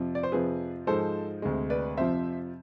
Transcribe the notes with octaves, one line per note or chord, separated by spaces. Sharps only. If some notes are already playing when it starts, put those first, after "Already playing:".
Already playing: F2 C3 F3
D5
C5
F2 C3 F3 G#4 B4
G#2 F3 G#3 A4 C5
D2 C3 G#3
B4 D5
F2 C3 F3 C5 E5